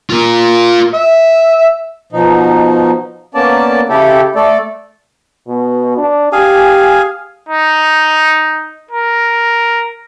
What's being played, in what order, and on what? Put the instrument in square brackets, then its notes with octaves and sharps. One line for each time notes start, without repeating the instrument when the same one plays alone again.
[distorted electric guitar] F4 A#4
[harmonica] E5
[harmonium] B2 F3 D#4
A#3 B3 C#4 D5 A5
C#3 E4 G4 A4
A3 A4 D5
[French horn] B2
D4
[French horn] G4 [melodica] G#4 F5 G#5
[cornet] D#4
A#4